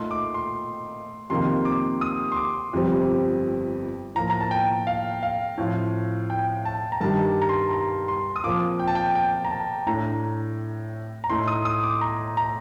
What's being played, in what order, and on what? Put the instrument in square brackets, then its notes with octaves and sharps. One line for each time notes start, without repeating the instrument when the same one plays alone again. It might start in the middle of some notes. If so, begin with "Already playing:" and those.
Already playing: [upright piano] A#2 A3 D#4 [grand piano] C6
[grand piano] D6
C6
[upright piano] F2 C3 D#3 A#3 [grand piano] C6
[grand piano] D6
D#6
C6
D6
[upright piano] G1 F2 C3 G3 C4
[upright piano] A2 F3 A#3 [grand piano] A#5
[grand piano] A#5
A5
G5
F5
F5
[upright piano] A2 F3 C4 F4
[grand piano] G5
A5
A#5
[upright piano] G2 D#3 G3 D4 [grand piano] A5
[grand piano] A#5
C6
A#5
C6
D#6
[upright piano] A#2 F3 C4 [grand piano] D6
[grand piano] G5
A5
G5
G5
A#5
A5
[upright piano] A2 A3 D4 [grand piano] A#5
[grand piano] A#5
[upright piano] A2 A3 D#4 [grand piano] C6
[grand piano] D#6
D#6
D6
A#5
A#5